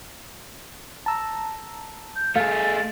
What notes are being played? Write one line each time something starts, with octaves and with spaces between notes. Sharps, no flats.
A5 A#5 E6
G6
A3 G#4 F5 A6